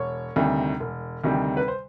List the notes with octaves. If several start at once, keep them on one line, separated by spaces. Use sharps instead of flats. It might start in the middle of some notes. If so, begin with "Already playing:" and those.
Already playing: E1 C#5
D2 C3 D#3 G3
E1
D2 C3 D#3 G3
B4
C5